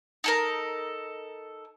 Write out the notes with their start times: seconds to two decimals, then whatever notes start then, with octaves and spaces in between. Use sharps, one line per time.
0.24 D#4 A4 A#4